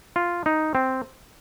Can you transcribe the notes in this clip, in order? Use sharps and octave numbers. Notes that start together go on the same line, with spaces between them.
F4
D#4
C4